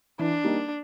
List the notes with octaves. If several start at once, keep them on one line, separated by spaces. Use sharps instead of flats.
E3 D4
G3 A#3 D#4